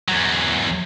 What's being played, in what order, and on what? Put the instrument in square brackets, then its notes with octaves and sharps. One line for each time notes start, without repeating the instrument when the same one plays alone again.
[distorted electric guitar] E2 F#3